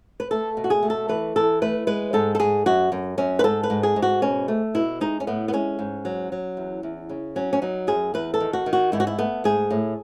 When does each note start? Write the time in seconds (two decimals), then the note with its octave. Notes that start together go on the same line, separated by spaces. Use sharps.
0.20 B4
0.31 A3 A4
0.57 B2
0.64 F#4
0.70 G#4
0.82 A3
0.90 A4
1.09 E3 B4
1.36 E3 A4
1.62 A3 B4
1.87 G#3 B4
2.13 G#2 A4
2.35 A4
2.40 G#2 G#4
2.66 F#2 F#4
2.92 F#2
3.18 F#2 C#4
3.39 B4
3.44 G#2 A4
3.63 B4
3.70 G#2
3.83 G#4
3.96 G#2
4.02 F#4
4.22 B2 C#4
4.48 A3
4.75 B2 E4
5.01 G#3 D#4
5.20 C#4
5.27 A2 B3
5.48 B3
5.53 G#3 C#4
5.79 G#2
6.05 F#3
6.32 F#3
6.57 E2
6.83 E2
7.09 C#3
7.36 F#3 C#4
7.53 C#4
7.62 F#3 D#4
7.87 F#2 G#4
8.14 E2 B4
8.34 A4
8.40 D#3
8.53 F#4
8.66 D#3
8.73 F#4
8.92 G#2 E4
9.00 F#4
9.07 E4
9.18 A3 B3
9.44 G#2 G#4
9.71 A2